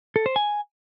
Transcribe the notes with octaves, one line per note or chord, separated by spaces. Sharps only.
A4
C5
G#5